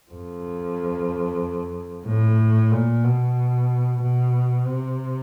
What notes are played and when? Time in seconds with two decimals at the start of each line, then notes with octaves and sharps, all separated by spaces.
0.12 F2
2.06 A2
2.72 A#2
3.04 B2
4.01 B2
4.66 C3